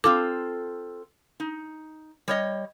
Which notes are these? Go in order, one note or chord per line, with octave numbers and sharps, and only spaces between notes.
C4 F4 A4 D6
D#4
G3 C#5 D#5